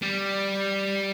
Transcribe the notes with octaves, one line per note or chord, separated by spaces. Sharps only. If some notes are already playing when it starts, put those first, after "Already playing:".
G3